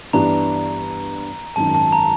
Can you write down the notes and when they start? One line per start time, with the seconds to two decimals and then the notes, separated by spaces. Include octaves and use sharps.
0.13 G2 E3 G3 B3 D4 A#5
1.56 G#1 F#2 D#3 A5
1.75 A5
1.93 A#5